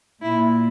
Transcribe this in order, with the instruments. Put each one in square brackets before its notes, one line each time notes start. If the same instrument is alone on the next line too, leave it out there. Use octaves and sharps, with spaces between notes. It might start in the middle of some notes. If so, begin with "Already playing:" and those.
[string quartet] A#2 A#3 E4